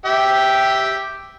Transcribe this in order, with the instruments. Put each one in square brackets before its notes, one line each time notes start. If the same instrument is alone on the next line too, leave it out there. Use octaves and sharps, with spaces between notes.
[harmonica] G4 E5 G5